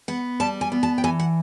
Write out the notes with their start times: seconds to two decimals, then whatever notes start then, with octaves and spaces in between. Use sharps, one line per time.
0.08 B3 F#5
0.40 G3 A5
0.61 G#5
0.72 B3
0.83 A5
0.98 G5
1.04 E3 G#5
1.20 F#5